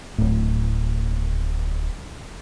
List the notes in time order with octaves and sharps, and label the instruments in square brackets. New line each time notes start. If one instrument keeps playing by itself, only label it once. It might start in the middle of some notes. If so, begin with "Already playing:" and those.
[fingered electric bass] D1 A2